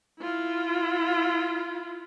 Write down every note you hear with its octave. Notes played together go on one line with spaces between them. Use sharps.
E4 F4